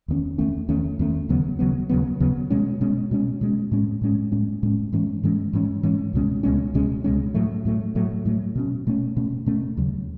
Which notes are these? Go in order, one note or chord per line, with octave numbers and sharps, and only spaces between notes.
E2 D#3 A3 C#4
E2 D#3 A3 C#4
E2 D#3 A3 C#4
E2 D#3 A3 C#4
D#2 C#3 F#3 B3
D#2 C#3 F#3 B3
D#2 C#3 F#3 B3
D#2 C#3 F#3 B3
B2 G#3 C#4
B2 G#3 C#4
B2 G#3 C#4
B2 G#3 C#4
A2 G#3 C#4
A2 G#3 C#4
A2 G#3 C#4
A2 G#3 C#4
G#2 E3 G#3 C#4
G#2 E3 G#3 C#4
G#2 E3 G#3 C#4
G#2 E3 G#3 C#4
C#2 B2 G#3 C#4
C#2 B2 G#3 C#4
C#2 B2 G#3 C#4
C#2 B2 G#3 C#4
A2 F#3 A3
A2 F#3 A3
A2 F#3 A3
A2 F#3 A3
B2 A3 C#4
B2 A3 C#4
B2 A3 C#4
B2 A3 C#4
D#2 C#3 F#3